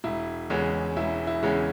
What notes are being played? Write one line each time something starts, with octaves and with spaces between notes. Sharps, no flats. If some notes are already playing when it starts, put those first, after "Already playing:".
E1 E4
E2 C#3 G#3 C#4
E1 E4
E4
E2 C#3 G#3 C#4